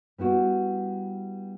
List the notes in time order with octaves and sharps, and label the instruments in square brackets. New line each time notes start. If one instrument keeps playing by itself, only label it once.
[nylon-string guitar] G3 B3 E4 F#4